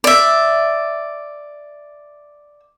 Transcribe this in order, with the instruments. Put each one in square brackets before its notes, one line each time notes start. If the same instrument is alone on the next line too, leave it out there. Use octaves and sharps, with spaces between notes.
[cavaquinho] D5 E5